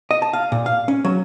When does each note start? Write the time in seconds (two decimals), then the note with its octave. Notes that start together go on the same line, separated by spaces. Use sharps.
0.11 D#5
0.22 A5
0.33 F5
0.52 A#2
0.66 F5
0.88 C#4
1.05 F#3